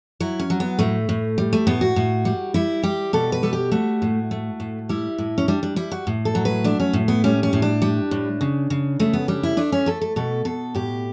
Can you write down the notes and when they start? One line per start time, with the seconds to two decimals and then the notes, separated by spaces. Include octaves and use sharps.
0.20 F#3 E4
0.40 C#4
0.50 F#3
0.60 B3
0.79 A2 A3
1.09 A2
1.38 G3
1.53 A3
1.67 A2 B3
1.81 F#4
1.96 A2
2.25 G3
2.54 G3 E4
2.83 G3 G4
3.13 B2 A4
3.32 B4
3.43 G3 A4
3.53 G4
3.72 A3 F#4
4.02 A2
4.31 A3
4.60 A2
4.89 G3 E4
5.18 A2
5.38 C#4
5.48 G3 D4
5.63 D4
5.76 G3 E4
5.91 F#4
6.07 A2
6.25 A4
6.35 F#3
6.45 B4
6.64 A3 D4
6.80 C#4
6.93 A2
7.08 B3
7.24 G3 C#4
7.43 C#4
7.53 A2
7.62 D4
7.82 G3
8.11 A2
8.41 C#3
8.70 C#3
9.00 C#3 A3
9.13 B3
9.28 G3 D4
9.43 E4
9.57 A3 D4
9.72 C#4
9.86 A3 A4
10.01 A4
10.16 B2 A4
10.45 B2 A4
10.75 A2 G4